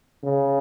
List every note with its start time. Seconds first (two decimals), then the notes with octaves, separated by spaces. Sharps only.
0.24 C#3